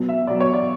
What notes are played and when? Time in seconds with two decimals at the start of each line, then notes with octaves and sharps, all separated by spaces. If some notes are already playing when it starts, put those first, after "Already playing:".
Already playing: B2 F#3 B3
0.09 E5
0.27 B2 F#3 B3 D5
0.40 C#5
0.54 D5